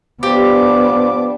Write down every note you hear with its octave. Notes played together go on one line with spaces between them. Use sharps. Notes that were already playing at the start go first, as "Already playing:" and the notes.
F3 B3 D4 F4 G4 D6